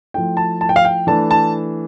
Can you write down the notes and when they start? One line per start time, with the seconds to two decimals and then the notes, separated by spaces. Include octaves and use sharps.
0.14 F3 A3 E4 G5
0.37 A5
0.61 A5
0.69 G5
0.76 F5
0.85 G5
1.07 E3 A3 D4 A5
1.31 A5